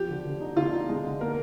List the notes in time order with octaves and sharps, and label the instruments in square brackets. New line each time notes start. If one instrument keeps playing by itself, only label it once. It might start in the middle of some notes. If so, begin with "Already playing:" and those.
Already playing: [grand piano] F3 [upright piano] G4
[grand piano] D3
D3
D#4
[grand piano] D3 [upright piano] F4
[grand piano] D#4
G#3
D3
[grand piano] A#3 [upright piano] A#4